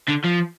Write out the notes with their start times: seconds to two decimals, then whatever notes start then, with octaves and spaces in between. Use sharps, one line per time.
0.09 D3
0.25 F3